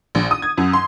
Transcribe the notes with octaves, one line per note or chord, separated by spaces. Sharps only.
A#1
D#6
G#6
F#2
C6